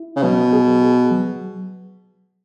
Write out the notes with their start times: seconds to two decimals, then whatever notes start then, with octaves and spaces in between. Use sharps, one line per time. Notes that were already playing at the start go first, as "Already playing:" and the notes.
Already playing: E4
0.16 C#3
0.23 B2 F#3
0.53 G#4
0.82 G#4
1.11 F#3